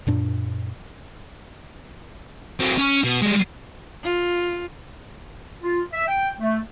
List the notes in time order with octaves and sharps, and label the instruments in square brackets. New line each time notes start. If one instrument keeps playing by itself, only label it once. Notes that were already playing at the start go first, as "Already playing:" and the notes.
[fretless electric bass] F#2 A#2 D4
[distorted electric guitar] F#3 C4
C#4
B2
G3 G#3
[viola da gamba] F4
[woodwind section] F4
E5
G5
A3